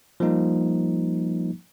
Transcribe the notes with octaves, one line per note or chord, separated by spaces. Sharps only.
F3 G3 A#3 D#4